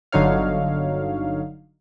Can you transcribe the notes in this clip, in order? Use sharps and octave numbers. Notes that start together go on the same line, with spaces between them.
G1 D3 F#3 D#4 C#5 F5